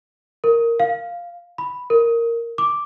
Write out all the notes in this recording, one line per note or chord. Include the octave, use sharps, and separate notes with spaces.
A#4
F5
B5
A#4
D6